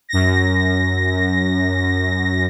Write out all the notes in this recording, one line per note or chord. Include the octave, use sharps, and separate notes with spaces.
F#2 A#6